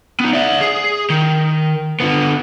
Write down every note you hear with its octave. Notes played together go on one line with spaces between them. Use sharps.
B3 D#4
D5 E5
G#4
D#3
D3 B3